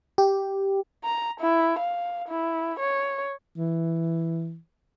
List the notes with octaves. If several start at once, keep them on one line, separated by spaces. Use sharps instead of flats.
G4
A#5
E4
F5
E4
C#5
E3